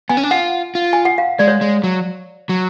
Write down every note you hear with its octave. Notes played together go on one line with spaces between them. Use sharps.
B3 G#5
C#4
D4
F4 F#5
F4
G#5
F#5
F5
G#3 D5
C#5
G#3
F#3
F#3